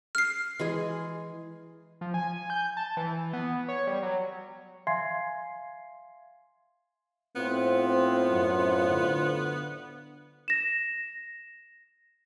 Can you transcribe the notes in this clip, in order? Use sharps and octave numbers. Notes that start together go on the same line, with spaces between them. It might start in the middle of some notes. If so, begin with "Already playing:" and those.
F6 C7
E3 G#3 G#4
F3
G#5
G6
A5
E3
B3
C#5
G3
F#3
E5 F5 G#5 C6 G#6 C7
A2 B3 C4 F4 C5
F#2
D3
A#6 E7